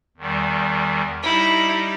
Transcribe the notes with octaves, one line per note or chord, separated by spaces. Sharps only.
E2 D#3 G3
G3 D#4 E4 G4 D#5